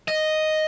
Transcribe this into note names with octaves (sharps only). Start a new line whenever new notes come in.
D#5